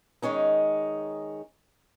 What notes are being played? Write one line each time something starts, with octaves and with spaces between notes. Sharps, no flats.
D#3 G#3 C#4 D#4